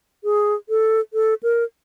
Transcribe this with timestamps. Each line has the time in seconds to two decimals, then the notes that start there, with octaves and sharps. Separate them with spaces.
0.24 G#4
0.69 A4
1.13 A4
1.43 A#4